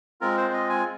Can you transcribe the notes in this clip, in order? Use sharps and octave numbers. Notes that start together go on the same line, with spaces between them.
G#3 C4 F4 A#4
C5
D#5
G#5